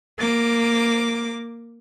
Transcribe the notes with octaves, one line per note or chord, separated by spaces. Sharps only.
A#3 D6